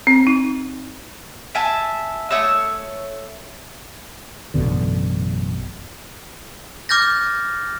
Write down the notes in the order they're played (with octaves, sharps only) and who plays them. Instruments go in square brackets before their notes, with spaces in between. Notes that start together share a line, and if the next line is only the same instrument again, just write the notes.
[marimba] C4
D#4
[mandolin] E5 G#5 A5
A3 C#5 D#6 E6
[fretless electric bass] A1 F#2 B2 D3
[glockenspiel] D6 F6 G6 A6 A#6